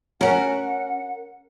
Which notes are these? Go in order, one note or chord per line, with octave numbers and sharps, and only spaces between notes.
C#4 F#4 A#4 F#5